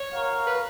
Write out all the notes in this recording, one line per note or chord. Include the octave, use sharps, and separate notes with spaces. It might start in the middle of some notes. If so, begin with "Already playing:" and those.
Already playing: C#5
F#4 A#4 F5
B4